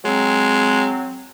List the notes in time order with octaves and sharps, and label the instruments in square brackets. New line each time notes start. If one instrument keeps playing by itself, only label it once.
[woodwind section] F#3 C4 [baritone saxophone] G#3